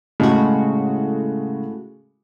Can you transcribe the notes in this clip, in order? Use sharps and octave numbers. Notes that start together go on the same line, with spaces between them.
A2 C#3 G#3 F#4